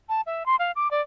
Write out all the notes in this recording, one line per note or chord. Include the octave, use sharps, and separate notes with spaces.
A5
E5
C6
F5
D6
D5